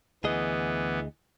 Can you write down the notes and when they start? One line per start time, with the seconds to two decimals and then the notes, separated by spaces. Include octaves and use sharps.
0.24 D2 E3 B3 G#4 D#5